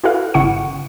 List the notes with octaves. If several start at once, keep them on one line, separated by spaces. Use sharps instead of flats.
E4 F#4 A4 B4 F5
G1 C#3 E4 F#5 C#6 C#7